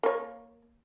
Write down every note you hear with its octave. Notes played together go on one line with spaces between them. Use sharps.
A#3 C#5